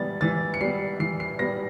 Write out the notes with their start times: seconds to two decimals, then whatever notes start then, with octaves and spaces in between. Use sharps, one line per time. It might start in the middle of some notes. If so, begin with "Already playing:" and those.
Already playing: E3 G3 B3 A6
0.21 E3 A6
0.54 C#7
0.61 G3 B3 C7
1.00 E3 C7
1.20 C7
1.39 G3 B3 A#6